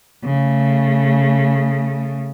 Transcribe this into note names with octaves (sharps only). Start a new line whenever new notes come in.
C#3 A3